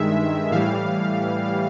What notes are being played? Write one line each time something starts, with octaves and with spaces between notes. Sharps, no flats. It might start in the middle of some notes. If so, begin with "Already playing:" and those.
Already playing: G2 D#3 G#3 E5
A2 E3 G3 F5